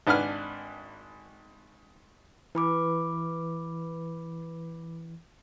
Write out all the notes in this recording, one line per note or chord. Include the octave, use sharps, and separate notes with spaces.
G#1 D4 B4 F#5 G#5 F6
E3 B4 B5 D6